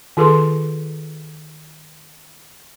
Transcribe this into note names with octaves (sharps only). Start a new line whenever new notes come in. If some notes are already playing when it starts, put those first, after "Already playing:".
D#3 F4 G#4 A4 B4 C6